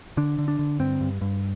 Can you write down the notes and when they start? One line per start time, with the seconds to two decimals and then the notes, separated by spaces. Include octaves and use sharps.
0.17 D3 D4
0.38 D3
0.48 D4
0.59 D3
0.79 G2 C4
1.01 G2
1.21 G2